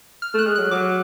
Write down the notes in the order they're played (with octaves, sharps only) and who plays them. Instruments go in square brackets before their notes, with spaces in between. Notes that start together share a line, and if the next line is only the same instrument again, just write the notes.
[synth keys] F6
[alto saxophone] A3 [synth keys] F#6
[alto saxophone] G#3
[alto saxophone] F#3 [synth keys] F#6
[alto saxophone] F#3 [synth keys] D6